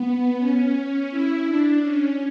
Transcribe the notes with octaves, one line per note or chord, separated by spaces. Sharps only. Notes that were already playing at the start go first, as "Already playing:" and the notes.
Already playing: B3
C#4
E4
D4
C#4